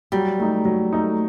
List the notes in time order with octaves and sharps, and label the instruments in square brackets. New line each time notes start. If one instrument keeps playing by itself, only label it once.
[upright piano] F#3 [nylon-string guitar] G3
[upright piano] A3 D#4
F#3
A3 D#4